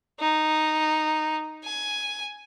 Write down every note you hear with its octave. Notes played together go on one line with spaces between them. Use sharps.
D#4
G#5